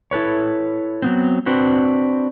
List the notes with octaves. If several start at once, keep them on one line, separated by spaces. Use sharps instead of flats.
E4 A4 B4 C#5
F#3 B3 C4
C4 D4 F#4 B4 C5